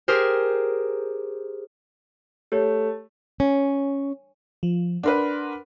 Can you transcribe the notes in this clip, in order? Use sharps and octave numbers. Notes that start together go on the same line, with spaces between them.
G4 G#4 A#4 C5
A3 G4 C#5
C#4
F3
D4 A#4 B4 F#5 C6